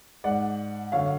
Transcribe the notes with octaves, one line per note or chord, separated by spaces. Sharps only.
G#2 D5 F#5
F#2 D3 C#5 F5